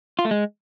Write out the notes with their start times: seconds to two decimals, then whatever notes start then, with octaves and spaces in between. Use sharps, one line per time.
0.19 F4
0.25 A3
0.31 G#3